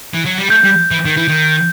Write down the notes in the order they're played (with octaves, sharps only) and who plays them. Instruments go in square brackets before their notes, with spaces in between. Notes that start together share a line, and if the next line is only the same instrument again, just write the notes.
[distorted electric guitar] E3
F#3
G3
[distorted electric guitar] A3 [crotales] G6
[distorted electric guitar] G3
E3
D#3
E3
D#3